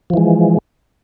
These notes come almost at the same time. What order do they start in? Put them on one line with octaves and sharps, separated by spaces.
F3 E3 G#3